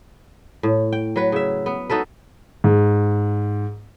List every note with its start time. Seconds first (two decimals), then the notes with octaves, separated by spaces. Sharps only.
0.63 A2
0.92 G5
1.16 F#3 B4
1.32 C#3 E5
1.66 B3
1.90 D#4 F#4 A4 B4
2.64 G#2